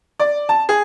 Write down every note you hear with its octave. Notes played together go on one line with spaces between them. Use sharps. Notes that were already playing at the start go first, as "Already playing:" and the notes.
D5
A5
G#4